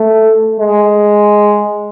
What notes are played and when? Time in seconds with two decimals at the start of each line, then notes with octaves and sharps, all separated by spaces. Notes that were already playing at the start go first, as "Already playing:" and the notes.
Already playing: A3
0.60 G#3